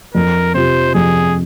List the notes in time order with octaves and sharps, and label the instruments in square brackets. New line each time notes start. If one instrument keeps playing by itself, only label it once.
[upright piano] F2 [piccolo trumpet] A#4
[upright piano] C3 F3 [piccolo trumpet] C5
[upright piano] F2 [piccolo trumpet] G#4